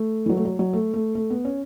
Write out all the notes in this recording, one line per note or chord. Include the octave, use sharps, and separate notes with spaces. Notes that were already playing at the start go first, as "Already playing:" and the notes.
Already playing: A3
E3
F#3
A3
F#3
F#3
A3
A3
A3
B3
C#4